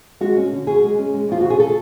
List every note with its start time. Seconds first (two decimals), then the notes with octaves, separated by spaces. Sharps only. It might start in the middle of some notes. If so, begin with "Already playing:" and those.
0.21 G#3 F#4
0.36 C#4
0.52 D3
0.67 F#2 G#4
0.83 G#3
0.98 C#4
1.14 G#3
1.29 F2 F4
1.41 C#3 F#4
1.50 G#4
1.60 A4